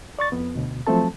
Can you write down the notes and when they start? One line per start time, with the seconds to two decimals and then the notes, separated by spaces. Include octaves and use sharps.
0.19 D5 C#6 A6
0.32 F2 B3
0.55 D2 B2
0.87 F3 F#3 A3 C4 A4 A5